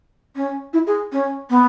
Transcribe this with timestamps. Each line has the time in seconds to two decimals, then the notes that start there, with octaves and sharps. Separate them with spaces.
0.36 C#4
0.73 E4
0.87 G#4
1.12 C#4
1.50 B3